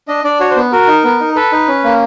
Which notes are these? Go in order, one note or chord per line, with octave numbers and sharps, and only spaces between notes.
D4 D#5
D4 D5
F#4 C#5
C5
B3
F#4 A#4
D#4
B3
D#4
A4 B4
D#4
C#4
A#3